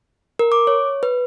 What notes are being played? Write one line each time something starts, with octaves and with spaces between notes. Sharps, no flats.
A#4
D6
C#5
B4